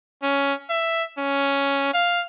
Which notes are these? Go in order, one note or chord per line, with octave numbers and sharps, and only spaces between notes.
C#4
E5
C#4
F5